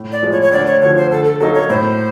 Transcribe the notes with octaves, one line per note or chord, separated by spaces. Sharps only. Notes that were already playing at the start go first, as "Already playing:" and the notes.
Already playing: A2
D5
F3 G#3
C#5
C#5
D2 D5
C#5
D3 F3 C#5
C5
D3 A4
A4
F#3 A#3 D#4 A4
C#5
A2 C5